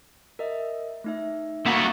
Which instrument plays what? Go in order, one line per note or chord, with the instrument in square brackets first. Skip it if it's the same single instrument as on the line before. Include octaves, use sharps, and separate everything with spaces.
[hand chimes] A#4 D#5 E5
A3 D#4 E5
[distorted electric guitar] A3 F#4 [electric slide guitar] A#3 F#5 [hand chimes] A#5 C#6